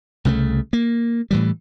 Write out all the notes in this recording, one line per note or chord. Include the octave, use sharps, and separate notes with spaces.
C2 C#3 G#3 A3
A#3
A2 E3 G3